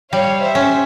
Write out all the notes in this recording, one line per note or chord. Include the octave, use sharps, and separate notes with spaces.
G3 C#5 F5
C5 E5
C#4